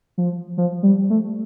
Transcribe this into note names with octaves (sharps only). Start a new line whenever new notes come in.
F3
F3
G3
A3